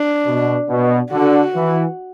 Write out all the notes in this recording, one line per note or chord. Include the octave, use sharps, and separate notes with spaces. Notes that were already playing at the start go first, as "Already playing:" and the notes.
Already playing: D4
B2
B2
D3 F#4
E3